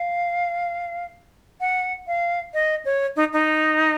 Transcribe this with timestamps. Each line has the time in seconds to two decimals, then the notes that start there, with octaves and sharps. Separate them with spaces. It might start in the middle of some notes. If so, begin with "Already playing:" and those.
Already playing: F5
1.61 F#5
2.07 F5
2.54 D#5
2.85 C#5
3.16 D#4
3.33 D#4